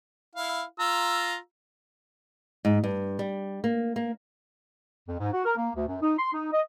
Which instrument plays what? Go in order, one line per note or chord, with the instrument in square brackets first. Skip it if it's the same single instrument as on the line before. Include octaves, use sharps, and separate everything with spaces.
[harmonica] E4 F5
F4 A#5 E6
[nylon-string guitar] G#2
G2
G3
A#3
A#3
[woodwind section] F2
G#2
F#4
A#4
A#3
D2
F#2
D#4
C6
D#4
D#5